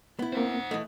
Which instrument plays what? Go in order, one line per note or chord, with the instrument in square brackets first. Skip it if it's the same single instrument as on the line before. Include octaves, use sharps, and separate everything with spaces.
[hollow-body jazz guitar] B3 E4
[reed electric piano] A#3 C4 [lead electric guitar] C5 F#5
[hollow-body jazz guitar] E3 A3 [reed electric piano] D#5